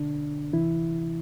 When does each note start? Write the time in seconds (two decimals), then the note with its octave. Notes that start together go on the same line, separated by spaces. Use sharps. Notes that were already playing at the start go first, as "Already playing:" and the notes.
Already playing: C2 B2 D3 D4
0.53 D2 C3 E3 E4